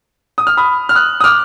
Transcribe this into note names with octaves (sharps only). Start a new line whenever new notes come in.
D#6
F6
B5 D#6
F6
D#6 F#6
D#6
D6 F6